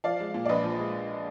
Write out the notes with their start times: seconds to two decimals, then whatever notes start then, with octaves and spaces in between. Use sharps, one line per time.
0.04 F3 D5 F5
0.20 G#3
0.34 A#2
0.45 D5
0.49 A#1 B4 D#5
0.64 F3
0.79 G#3